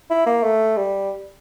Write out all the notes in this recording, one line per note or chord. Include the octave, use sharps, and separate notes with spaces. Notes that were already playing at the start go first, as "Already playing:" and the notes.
E4
A#3
A3
G3